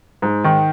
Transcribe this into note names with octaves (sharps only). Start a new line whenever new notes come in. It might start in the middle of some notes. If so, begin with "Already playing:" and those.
G#2
D#3